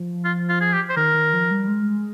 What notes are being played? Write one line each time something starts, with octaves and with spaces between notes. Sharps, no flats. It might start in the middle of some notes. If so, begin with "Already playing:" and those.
Already playing: F3
F4
F4
G#4
G4
C5
D#3 A#4
D#3
F3
G3
G#3